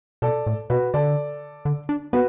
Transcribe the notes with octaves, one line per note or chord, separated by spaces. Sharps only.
B2 A4 D5
A2
B2 F#4 B4
D3 A4 D5
D3
D4
B3 F#4 B4